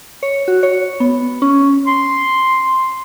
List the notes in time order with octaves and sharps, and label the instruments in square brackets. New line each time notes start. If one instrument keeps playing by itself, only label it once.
[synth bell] C#5
F#4
C#5
B3
C#4
[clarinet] C6